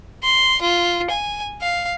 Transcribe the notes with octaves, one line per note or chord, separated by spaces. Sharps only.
C6
F4
G#5
F5